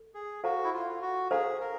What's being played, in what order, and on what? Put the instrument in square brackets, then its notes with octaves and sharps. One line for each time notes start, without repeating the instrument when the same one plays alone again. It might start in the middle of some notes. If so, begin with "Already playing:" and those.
Already playing: [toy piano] A4
[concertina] G#4
[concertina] F#4 [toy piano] A4 C5 F5 A#5
[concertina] E4
F4
F#4
[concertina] G#4 [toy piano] A4 C5 F5 A#5
[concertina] A#4